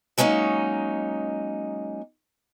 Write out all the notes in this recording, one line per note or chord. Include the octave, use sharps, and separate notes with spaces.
F#3 G#3 A#3 C#4 D#4